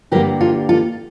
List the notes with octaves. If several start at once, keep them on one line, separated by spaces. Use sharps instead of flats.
G2 D3 G3 A#3 G4 A#4
F4 A4
F4 A4